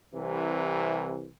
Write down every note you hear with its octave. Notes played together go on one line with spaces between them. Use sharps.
C2 C3 E3